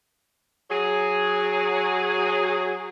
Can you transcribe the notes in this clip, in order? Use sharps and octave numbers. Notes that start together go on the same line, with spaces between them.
F#3 G#4